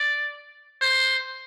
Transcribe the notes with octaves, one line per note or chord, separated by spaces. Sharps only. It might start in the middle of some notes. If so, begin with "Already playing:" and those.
Already playing: D5
C5